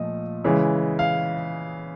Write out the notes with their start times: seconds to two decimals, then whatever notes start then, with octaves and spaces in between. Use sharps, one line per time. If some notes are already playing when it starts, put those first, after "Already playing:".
Already playing: A#2 F3 A3 D#5
0.44 C#3 E3 G#3
0.99 F5